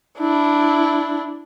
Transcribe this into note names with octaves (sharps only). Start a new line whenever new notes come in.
D4 E4